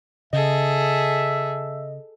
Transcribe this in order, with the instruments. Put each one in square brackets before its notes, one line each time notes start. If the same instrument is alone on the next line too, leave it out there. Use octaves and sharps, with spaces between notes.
[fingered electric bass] C#3 [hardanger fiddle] G#4 A4 [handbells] D#5 [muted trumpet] E5